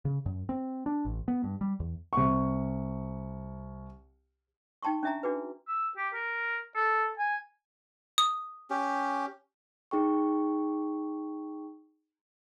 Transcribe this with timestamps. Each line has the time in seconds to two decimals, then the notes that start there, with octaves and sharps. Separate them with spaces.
0.05 C#3
0.26 F#2
0.49 C4
0.86 D4
1.05 A1
1.28 B3
1.44 G2
1.61 G3
1.80 E2
2.13 C2 C#6
4.83 D#4 G5 A5 C6 C#6
5.03 C#4 D4 E5 G#5 A#5
5.23 D4 F#4 G#4 B4
5.68 E6
5.97 G4
6.14 A#4
6.75 A4
7.18 G#5
8.18 D#6
8.70 C#4 G4
9.91 D#4 G#4 G5 C#6